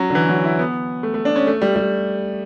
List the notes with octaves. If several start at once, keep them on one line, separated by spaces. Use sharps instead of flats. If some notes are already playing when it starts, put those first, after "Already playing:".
Already playing: F#3 C#4
D3
E3
F#3
E4
B3
A3
A3
D4
C#4
A3
G3
G3